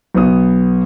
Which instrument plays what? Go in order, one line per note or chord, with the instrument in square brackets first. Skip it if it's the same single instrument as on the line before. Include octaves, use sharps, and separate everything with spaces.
[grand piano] B1 B3 D#6